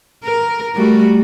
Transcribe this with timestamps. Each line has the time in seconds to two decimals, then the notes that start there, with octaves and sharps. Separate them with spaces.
0.24 A#4
0.75 G3 A3 F#4